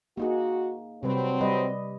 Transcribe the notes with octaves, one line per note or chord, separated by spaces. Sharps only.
A#3 D#4 F#4 G#4
C3 F#3 G3 C4 B4
G3 B4 D#5